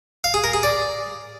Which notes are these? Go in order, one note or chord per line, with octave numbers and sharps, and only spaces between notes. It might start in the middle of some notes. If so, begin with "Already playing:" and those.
F5
G#4
A#4
G#4
D5